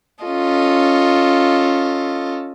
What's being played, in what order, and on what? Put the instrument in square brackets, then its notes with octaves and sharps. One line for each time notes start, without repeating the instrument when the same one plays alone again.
[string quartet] C#4 F4 A4 D#5